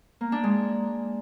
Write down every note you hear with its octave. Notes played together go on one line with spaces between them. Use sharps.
A#3
D4
G#3